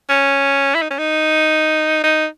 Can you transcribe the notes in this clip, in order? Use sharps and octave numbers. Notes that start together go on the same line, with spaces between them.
C#4
E4
D#4
C#4
D#4
D#4